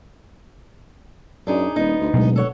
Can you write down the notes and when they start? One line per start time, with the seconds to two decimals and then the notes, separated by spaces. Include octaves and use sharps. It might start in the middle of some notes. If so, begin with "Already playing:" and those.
1.47 F#2 D4 D#4 G#4
1.76 D#1 B3 D#4
2.00 D2
2.14 D1 B2 F#3 G#3
2.36 A4 C#5 F#5